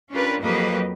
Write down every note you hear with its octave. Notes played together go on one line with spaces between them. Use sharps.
C#4 D4 F4 G4 A#4 B4
F2 F#3 A#3 G4 B4 D#5